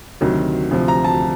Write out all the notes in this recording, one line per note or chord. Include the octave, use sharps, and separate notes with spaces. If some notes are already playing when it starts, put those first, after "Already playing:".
D2 C3 D#3 F#3
D2 C3 F3
A#5
A5